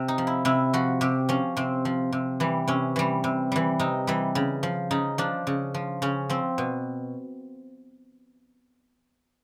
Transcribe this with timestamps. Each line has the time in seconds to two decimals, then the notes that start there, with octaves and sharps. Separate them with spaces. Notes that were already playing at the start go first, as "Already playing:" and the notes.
Already playing: C3
0.08 D#4
0.18 F3
0.27 E4
0.45 C3 E4
0.73 F3 F#4
1.01 C3 G4
1.29 F3 C#4
1.57 C3 C4
1.85 F3
2.12 C3
2.40 E3 G3
2.68 C3 C#4
2.96 E3 G3
3.24 C3
3.52 E3 G3
3.79 C3 D#4
4.07 E3 G3
4.35 C#3
4.63 F3
4.91 C#3 D#4
5.18 F3 D4
5.47 C#3
5.74 F3
6.02 C#3 C#4
6.29 F3 C4
6.58 B2